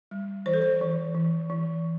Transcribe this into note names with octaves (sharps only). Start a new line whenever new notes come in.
G3
E3 C5
A4
C5
E3
E3
E3